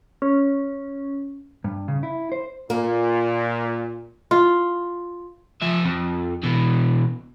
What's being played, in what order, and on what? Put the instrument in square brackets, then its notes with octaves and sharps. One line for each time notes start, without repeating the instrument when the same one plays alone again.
[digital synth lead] C#4
[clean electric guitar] G2
C#3
E4
C5
[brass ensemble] A#2 [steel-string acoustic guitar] A#3
[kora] F4
[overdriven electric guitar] F3 E5
F2
B2 E3